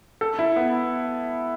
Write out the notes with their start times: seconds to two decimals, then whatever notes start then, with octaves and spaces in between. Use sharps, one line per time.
0.21 A4
0.39 E4
0.56 B3